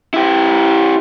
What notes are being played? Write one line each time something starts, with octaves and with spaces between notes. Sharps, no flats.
E4 G4